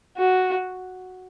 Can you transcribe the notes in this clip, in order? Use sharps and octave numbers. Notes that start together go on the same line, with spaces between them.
F#4